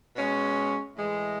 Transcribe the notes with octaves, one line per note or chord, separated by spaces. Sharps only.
B2 G#3 C#4
A2 E3 G#3